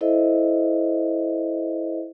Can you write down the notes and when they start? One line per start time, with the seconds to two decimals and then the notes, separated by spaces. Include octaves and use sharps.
0.01 E4 A4 C5 D#5 E5